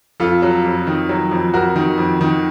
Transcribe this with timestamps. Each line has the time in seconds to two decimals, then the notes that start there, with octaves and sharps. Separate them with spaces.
0.20 F2 F4 A4
0.42 F#3
0.64 F2
0.87 D#3
1.09 F#3
1.31 F2
1.54 F2 F#4 A#4
1.76 D#3
1.98 F2
2.21 D#3